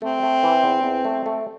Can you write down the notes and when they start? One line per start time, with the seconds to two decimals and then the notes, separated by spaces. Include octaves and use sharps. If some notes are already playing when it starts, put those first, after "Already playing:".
0.02 A3 C4
0.23 A3
0.43 E3
0.64 E2
0.84 E2
1.05 A3
1.26 A3